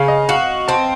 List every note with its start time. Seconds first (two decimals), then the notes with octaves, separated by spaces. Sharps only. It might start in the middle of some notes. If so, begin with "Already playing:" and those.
Already playing: C#3 F5
0.08 D#5
0.28 F#4 F5
0.68 C4 A5